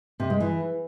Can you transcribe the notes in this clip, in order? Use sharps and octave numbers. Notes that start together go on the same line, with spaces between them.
C3
G#3
E3